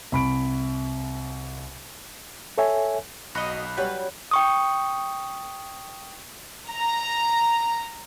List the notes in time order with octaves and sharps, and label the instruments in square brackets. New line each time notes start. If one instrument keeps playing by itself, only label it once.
[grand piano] C2 B5 D7
[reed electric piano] A4 C#5 E5 G#5
[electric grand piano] B1 B5 F#6 [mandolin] F#4 D#5
[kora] F#3 G3 C#4 [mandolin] B4
[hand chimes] G5 C#6 D#6
[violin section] A#5